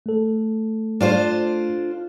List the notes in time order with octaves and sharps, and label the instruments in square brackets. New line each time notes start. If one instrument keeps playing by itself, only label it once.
[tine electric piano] A3 A4
[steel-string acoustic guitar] D4 F4 C5